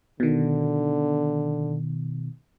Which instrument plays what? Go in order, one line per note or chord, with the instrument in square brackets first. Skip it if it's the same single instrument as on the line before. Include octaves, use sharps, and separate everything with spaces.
[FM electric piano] B2 D#3 [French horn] D3